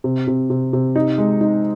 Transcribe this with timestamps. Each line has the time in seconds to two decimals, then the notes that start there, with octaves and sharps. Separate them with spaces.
0.04 C3
0.27 C3
0.50 C3
0.73 C3
0.96 D#4
1.18 G#3
1.41 D#4